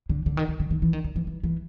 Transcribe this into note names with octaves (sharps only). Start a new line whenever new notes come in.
D3
D3
D#3
D3
D3
D#3
E3
D#3
D3
E3
E3
E3